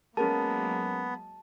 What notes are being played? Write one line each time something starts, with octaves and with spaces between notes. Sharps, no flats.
F#3 G#3 A#3 B3 C#4 G#4 A#4 A5